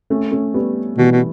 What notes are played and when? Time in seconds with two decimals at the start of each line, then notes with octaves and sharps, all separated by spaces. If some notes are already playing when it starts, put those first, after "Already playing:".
0.10 A3 C#4
0.31 A3 C#4
0.54 G3 B3
0.98 B2 E3 G3
1.12 B2